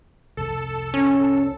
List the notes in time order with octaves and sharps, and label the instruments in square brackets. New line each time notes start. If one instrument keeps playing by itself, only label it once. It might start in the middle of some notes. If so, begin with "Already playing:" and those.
[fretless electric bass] C2 F2 C3 [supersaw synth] A4
[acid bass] C#4